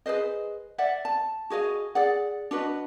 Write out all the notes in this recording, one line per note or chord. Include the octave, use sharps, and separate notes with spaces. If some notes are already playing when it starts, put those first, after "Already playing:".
G#4 B4 C5 D#5
D5 E5 F#5
A5
F#4 G#4 D#5 F5
G#4 D5 F#5
D4 F#4 B4 D#5